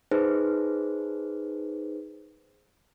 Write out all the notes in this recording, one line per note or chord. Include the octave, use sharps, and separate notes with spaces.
D#4 G#4 B4 C5